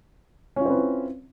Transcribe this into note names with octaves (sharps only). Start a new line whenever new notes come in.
C4 C#4 E4 F4 B4